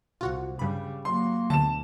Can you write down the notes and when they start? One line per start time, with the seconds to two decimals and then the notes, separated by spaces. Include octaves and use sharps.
0.21 C2 F4 F#4 F#5
0.59 G2 C#3 G3 B5
1.05 F#3 A#3 C6
1.50 D2 B2 D3 A5 E7